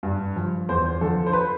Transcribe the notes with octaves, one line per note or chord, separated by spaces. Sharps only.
G2
F3
E2 C5
D3 F3 A4
C5
B4